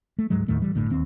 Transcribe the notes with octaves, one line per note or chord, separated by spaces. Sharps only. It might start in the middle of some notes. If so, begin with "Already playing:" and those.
A3
D1 G#2 F#3 G#3
D#2 A2 D#3 A3
E3 G3
F#1 A2 D3
D1 D#2 C4